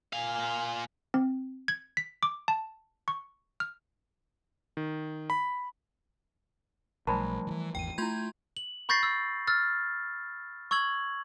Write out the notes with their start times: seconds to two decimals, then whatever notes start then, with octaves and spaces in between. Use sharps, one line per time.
0.13 A#2 F5 G#5
1.14 C4
1.68 G#6
1.97 B6
2.23 D6
2.48 A5
3.08 C#6
3.60 F6
4.77 D#3
5.30 B5
7.07 B1 F3 G3 A3 A5 B5
7.47 D#3 E3
7.75 G#1 E2 G5 D#7
7.98 A3 E4 F4 C6 G6 G#6
8.57 F#7
8.89 B5 C#6 G6 A6 A#6 C7
9.03 E6
9.47 E6 F6 A6
10.71 C#6 E6 G#6 F#7